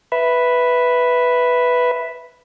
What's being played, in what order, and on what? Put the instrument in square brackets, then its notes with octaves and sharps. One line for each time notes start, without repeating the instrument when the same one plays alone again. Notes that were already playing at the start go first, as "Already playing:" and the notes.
[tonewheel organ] B4 E5